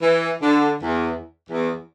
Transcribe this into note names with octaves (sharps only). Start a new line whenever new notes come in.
E3
D3
E2
E2